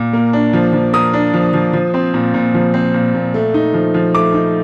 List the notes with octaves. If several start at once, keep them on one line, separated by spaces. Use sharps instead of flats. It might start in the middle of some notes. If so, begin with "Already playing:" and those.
Already playing: A#2
A#3
D4
F3
F3
A#3 D#6
D4
F3
F3
F3
C4
A#2
A#2
F3
C4
A#2
A#2
A3
D#4
F3
F3
A3 D6
D#4